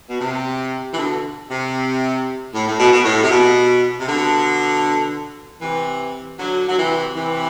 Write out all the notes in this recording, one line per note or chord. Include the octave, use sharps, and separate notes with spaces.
B2
C3
E3
B2 D3
C3
A2
A2
B2
B2
A2
C3
B2
C3
B2 D3
C3 E3
D3 F#3
F#3
C3 E3
C3 E3